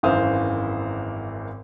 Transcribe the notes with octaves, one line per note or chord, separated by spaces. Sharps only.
G#1 F#2 E3 C5 F5 D#6